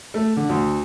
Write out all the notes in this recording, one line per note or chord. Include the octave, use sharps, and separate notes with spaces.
A3
D3
D2